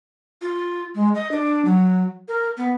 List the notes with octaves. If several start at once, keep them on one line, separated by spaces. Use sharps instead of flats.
F4
G#3
D#5
D4
F#3
A#4
B3